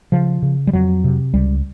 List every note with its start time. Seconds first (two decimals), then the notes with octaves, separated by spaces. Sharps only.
0.12 C#3 F3
0.42 C#3
0.67 G3
0.73 F2 F#3
1.04 C3
1.34 C#2 G3